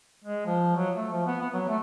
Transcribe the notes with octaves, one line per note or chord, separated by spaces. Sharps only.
G#3
F3
F#3
A3
F3
B3
B3
F#3
A3